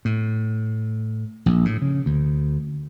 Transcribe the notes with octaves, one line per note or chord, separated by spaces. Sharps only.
A2
A#1
A2
C#3
D2